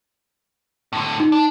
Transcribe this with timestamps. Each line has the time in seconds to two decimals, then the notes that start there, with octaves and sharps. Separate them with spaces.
0.93 A2 D3
1.20 D#4
1.32 D4